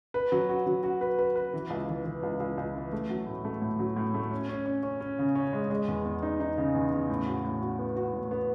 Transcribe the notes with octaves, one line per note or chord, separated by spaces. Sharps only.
B4
F#3
F#4
F#3
F#4
B4
B4
B4
E3
C#2
E3
E3
C#2
C#2
C#2
E3
A3
F#3
A2
A3
A2
F#3
A2
A3
C#4
C#4
C#4
C#4
C#4
C#3
C#4
G#3
G#3
E2
E2
D#4
D#4
C#3
E2
C#3
A2
F#4
A2
F#4
B3
F#4
A2
B3